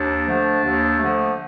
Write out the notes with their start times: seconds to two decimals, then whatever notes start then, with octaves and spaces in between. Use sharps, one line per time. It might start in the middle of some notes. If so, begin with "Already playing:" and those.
Already playing: D#2 D4
0.27 D3 F3 A3
0.63 D#2
0.99 D3 F3 A3